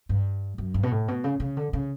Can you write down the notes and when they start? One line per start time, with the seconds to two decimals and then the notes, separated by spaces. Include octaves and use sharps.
0.09 G2
0.58 F#2
0.74 G2
0.83 B2
0.91 A2
1.08 B2
1.24 C#3
1.40 C#3
1.57 D3
1.73 C#3